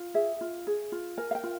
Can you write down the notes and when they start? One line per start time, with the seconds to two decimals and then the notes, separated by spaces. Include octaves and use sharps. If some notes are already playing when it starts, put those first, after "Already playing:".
Already playing: F4
0.14 G#4 E5
0.41 F4
0.67 G#4
0.92 F4
1.18 A#4 G#5
1.31 F5
1.35 G5
1.44 F4